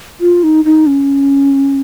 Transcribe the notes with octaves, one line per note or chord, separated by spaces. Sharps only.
F4
D#4
D#4
C#4